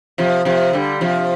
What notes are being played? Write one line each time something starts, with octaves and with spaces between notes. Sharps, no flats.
C3 F3
C3 F3
D3 G3
C3 F3